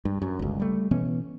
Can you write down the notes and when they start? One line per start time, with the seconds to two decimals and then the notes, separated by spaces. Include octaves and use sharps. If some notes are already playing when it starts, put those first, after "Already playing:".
0.05 G2
0.22 F#2
0.39 G1 C#2
0.60 G3 A3
0.91 B2 E3 B3 C#4